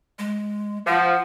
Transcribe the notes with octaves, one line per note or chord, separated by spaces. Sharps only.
G#3
F3 F#5